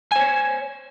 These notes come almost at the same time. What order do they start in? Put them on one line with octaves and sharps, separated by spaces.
G#5 C5 C#5